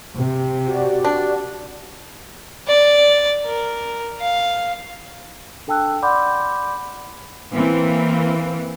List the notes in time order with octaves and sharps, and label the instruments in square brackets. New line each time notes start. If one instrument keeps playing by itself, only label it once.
[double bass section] C3
[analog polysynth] F#4 G4 D5
[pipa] D4
[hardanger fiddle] D5
A#4
F5
[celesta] D4 A4 G5 A5 E6 F#6
D5 F#5 B5 C6 D6 G6
[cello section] E3 A#3 C4